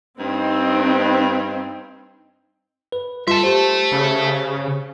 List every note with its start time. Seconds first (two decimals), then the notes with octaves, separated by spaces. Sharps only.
0.20 G2 C4 D#4
2.92 B4
3.28 G3 F4 E5 A5 C6
3.44 G4 C5
3.92 C#3